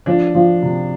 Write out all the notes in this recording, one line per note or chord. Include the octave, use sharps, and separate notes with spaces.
F3 D4
F3
C3